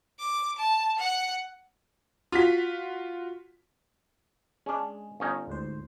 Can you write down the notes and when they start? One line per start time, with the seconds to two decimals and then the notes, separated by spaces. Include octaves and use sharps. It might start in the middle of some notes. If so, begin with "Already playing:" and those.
0.19 D6
0.58 A5
0.98 F#5
2.32 F4 F#4 B6
4.66 G#3 C#4 D4 G#4
5.20 G1 C#4 D#4
5.47 D2 G#2 C5